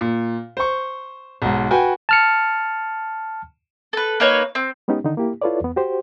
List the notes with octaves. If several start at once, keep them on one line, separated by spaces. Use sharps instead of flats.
A#2
C5 C#6
B1 G#2
F#4 B4 G5 G#5
A5 F6 C#7
A4 B4
A#3 D#4 B4 C#5
C4
G#3 B3 C#4 D#4 G4
D3 D#3 D#4
A#3 E4 G4
E4 F4 A4 B4 C#5 D5
E2 B3
F#4 G4 C5